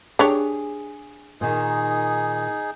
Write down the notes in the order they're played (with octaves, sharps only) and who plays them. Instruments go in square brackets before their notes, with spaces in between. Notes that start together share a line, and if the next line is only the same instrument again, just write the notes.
[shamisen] D4 G4 C#5 [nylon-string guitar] G#4
[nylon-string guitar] A#2 D#3 [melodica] D#4 G#4